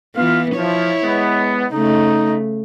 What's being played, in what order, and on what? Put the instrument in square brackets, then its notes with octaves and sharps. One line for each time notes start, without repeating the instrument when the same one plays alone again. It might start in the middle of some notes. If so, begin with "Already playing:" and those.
[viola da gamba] E3 B3 [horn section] F4 F5
[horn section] F3 [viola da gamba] E4 C#5
[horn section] G#3 B3
[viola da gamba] C#3 A3 [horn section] D#4